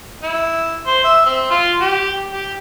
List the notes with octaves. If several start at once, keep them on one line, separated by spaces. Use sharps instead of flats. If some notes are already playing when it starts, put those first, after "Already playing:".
E4
C5
E5
C4
F4
G4
G4